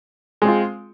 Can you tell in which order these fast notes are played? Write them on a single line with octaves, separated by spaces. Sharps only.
G#3 C4 F4